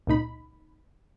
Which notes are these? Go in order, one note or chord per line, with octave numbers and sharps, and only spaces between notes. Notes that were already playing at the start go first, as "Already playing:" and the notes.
C#2 A#2 D#4 B5